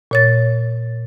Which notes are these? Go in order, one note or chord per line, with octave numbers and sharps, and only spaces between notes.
A#2 C#5 A6